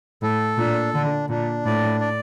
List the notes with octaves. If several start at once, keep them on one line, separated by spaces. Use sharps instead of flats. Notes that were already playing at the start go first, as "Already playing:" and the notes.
A2 A4
A#2 D4
D3 D4
A#2 D4
A2 D5
D5